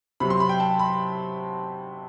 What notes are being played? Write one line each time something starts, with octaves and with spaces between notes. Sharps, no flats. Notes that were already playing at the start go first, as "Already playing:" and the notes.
C3 F#3 B5
C6
B5
G5
A5
B5